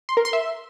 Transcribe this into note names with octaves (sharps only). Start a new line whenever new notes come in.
C6
A#4
C6
E5